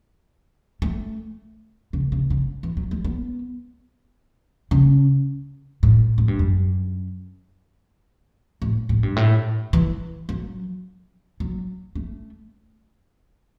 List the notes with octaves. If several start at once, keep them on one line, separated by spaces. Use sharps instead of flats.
A3
C#3
C#3
C#3
E3
F#3
A3
B3
C#3
A2
A2
G2
F#2
A2
A2
G2
A2
E3
F#3
F#3
A3